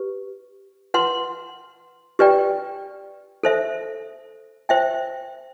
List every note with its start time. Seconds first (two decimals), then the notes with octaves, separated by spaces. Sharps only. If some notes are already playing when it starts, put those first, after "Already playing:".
Already playing: G4 B4
0.94 B4 F#5 C6
2.19 G4 B4 D5 G5
3.43 A4 C5 E5
4.69 C5 E5 G5